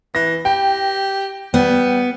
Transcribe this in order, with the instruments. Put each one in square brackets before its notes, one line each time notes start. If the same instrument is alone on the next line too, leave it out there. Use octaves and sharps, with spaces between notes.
[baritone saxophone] E3 [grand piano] A#6
[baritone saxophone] G4 [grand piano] G5
[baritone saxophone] G3 [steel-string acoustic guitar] B3